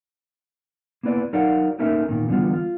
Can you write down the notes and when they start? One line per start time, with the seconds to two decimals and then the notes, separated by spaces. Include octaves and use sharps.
1.03 A#3 B3 E4 B4 D5
1.33 F#3 D#4 A#4 D5 F5 F#5
1.79 A3 A#3 C#4 D#4 A#4 E5
2.09 E2 A#2 D#3
2.29 D3 E3 G3 B3 F4
2.54 F4